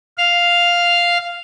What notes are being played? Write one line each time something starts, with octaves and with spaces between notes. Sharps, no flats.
F5 F6